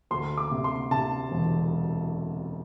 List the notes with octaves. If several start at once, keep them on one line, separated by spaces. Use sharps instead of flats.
D2 C6
D6
C3
C6
C3 A5
E1